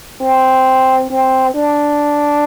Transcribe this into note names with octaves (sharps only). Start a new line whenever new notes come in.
C4
C4
D4